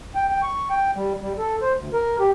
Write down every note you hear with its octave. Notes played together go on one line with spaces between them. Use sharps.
G5
G5
C#6
G5
G3
G3
A4
C5
D2
A#4
G4